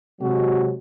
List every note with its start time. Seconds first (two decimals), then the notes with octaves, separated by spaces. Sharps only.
0.21 C3 F#3 G#3 F#4